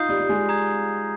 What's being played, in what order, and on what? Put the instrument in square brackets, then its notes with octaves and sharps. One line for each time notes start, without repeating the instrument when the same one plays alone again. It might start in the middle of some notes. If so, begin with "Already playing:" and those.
Already playing: [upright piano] D#4 F4 [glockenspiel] D#6 G6 C7
[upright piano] G3
G3
G#3
[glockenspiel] A#5 D#6 G#6